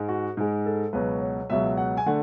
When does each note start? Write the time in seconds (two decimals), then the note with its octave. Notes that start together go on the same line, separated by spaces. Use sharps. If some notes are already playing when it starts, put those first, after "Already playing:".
Already playing: G#2 G#3
0.08 F#4
0.37 G#2 G#3
0.66 A4
0.93 C#2 B2 F#3 B4
1.21 C#5
1.50 C#2 B2 F#3 E5
1.77 F#5
1.97 G#5
2.06 D3 A3 F#5